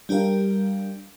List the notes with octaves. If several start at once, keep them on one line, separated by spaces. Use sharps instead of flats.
G3 D4 G4 A#4 F5